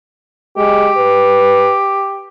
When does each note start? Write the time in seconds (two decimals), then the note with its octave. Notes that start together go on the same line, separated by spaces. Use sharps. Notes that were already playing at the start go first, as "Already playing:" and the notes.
0.57 G#3 G4
0.98 B4